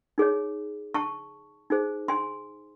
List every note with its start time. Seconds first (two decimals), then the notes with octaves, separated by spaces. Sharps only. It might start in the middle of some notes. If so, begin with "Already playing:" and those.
0.18 D#4 G#4 C#5
0.94 A5 C#6
1.70 D#4 G#4 C5
2.08 G#5 C6